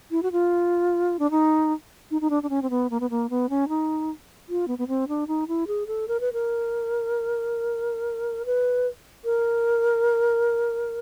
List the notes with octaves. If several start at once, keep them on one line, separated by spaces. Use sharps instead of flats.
E4
F#4
F4
D4
D#4
D#4
D#4
D4
D4
C#4
C4
B3
A#3
B3
A#3
B3
C#4
D#4
F4
B3
B3
C4
D4
D#4
E4
G#4
A4
A#4
B4
A#4
B4
A#4